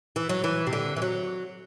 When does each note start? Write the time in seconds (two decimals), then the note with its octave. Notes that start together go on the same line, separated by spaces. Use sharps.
0.16 E3
0.29 F#3
0.44 E3
0.67 C3
0.73 D3
0.96 E3
1.02 F#3